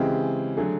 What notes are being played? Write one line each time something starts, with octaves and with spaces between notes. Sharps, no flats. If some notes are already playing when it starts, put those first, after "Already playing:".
Already playing: C#3 E3 G#3 C4 G4
D3 F#3 A3 G#4